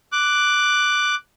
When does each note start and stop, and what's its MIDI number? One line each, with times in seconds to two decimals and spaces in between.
0.12 1.15 86
0.12 1.15 90